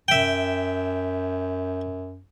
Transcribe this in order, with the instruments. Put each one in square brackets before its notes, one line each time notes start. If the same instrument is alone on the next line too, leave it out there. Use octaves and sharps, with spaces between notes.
[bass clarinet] F#2 [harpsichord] E5 G5